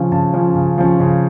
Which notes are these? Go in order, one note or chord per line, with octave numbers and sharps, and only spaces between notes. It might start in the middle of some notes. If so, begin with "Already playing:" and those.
Already playing: C#3 F3 C#4
C#3 A5
F3 C#4
C#3
F3 C#4
C#3